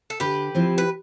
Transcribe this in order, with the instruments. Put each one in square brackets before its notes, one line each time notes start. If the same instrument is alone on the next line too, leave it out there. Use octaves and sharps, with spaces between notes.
[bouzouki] A4
[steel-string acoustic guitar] D3 [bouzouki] G4 B4
[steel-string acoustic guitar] F3 C4 E4
[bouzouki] B4